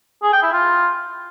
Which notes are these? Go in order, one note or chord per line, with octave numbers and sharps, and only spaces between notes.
G#4
G5
E4
F4